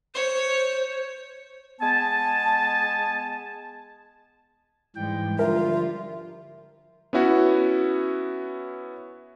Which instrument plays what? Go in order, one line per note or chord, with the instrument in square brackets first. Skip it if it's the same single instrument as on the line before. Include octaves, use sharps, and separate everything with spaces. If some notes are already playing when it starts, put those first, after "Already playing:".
[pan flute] C5 [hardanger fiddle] C#5
[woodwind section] G#3 B3 G#5 A5
[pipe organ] G#2 E3 G5 [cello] G3 G#3
[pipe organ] D3 F3 G3 [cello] F4 [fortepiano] A#4 [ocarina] E5
[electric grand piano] B3 C#4 E4 F#4